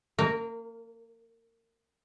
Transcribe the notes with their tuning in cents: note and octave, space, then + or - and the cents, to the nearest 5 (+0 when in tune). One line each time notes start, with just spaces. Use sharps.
A#3 -30 A#4 +0